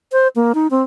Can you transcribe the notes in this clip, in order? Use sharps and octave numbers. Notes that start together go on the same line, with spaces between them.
C5
A#3
D#4
C4